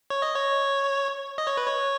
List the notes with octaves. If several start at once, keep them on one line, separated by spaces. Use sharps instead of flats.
C#5
D#5
C#5
D#5
C#5
B4
C#5